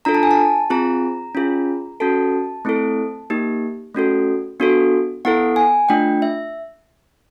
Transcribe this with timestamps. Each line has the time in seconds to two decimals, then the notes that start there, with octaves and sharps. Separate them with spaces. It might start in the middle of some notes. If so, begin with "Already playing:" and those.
0.05 D4 F4 A4 A#5
0.15 A5
0.23 G#5
0.31 A5
0.70 C4 F4 G#4 A#5
1.35 C#4 F4 G#4
2.00 C#4 F#4 A4 A5
2.65 A3 C4 E4 A4
3.30 A#3 D#4 G4
3.95 A3 C#4 F#4 A4
4.60 B3 D4 F#4 A4
5.25 B3 E4 A4 F#5
5.56 G#5
5.89 A3 D4 F4 G5
6.22 E5